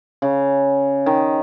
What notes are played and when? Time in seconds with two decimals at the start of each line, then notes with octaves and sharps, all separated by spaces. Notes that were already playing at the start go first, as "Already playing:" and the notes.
0.22 C#3
1.06 D#3